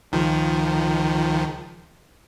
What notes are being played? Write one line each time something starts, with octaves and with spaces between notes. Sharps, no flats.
C#2 D#3 F3